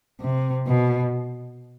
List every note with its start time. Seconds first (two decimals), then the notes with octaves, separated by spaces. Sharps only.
0.21 C3
0.67 B2